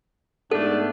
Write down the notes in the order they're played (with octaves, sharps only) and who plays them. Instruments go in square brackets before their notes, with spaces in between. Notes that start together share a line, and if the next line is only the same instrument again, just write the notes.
[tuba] G#2 [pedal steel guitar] A3 B3 [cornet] D4 [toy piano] A4